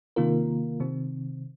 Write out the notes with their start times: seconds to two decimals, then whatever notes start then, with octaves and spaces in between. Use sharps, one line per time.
0.16 C3 D#3 A#3 F4 A#4
0.80 C3 D#3 C4